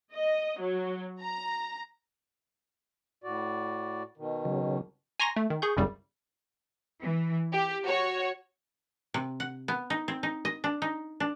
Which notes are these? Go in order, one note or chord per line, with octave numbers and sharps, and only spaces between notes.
D#5
F#3
A#5
A2 F#4 D5
B2 D#3
C#3 F#3
G#5 A#5 C6 C#6 A#6
A3
D#3
G#4 C#6 G6
G1 C2 F#2 C#3 G3
E3
G4
F#4 C#5
C3
F#5
B3
D#4
C4
D#4
D#5
D4
D#4
D4